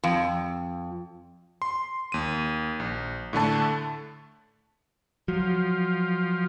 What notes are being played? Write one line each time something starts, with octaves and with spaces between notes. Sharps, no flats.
F2
C6
D#2 D#7
A#1
A2 D3 A3 A5
F3 F#3